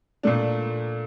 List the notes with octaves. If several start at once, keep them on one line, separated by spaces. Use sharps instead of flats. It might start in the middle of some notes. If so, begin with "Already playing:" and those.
A#2 A3 D4